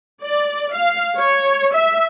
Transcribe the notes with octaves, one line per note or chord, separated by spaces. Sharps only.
D5
F5
C#5
E5